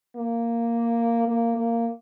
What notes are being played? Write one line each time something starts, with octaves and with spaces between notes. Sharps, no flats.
A#3
A#3
A#3